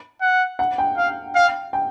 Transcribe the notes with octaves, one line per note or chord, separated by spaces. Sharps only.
F#5
F#5
G5
F5
F5
G5